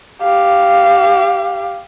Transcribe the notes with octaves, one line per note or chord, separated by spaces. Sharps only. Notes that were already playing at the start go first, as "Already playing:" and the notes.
G4 F5